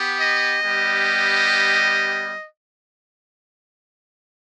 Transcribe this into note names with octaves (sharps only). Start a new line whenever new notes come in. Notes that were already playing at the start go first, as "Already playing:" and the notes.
Already playing: B3 G4
D#5
G3 B3 G4